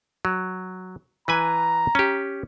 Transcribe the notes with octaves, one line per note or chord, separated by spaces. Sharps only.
F#3
E3 B4 G#5 A#5
C#4 G4